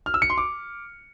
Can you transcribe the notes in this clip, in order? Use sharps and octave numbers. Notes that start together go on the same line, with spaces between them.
F6
E6
C#7
C6
D6